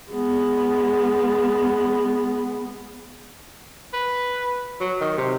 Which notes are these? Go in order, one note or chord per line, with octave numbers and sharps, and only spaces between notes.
G#3 B3
B4
F#3
D#3
C3